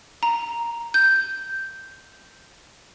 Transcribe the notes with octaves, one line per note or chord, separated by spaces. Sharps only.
A#5
G6